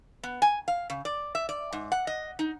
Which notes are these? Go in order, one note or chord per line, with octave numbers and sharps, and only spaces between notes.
B3
G#5
F5
C#3
D5
E5
D5
G#2
F#5
D#5
D#4